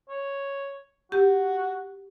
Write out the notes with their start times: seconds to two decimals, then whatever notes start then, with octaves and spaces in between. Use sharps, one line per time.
0.09 C#5
1.12 F#4 G4